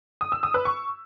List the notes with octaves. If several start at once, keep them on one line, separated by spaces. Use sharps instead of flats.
D#6
E6
D#6
B4
C#6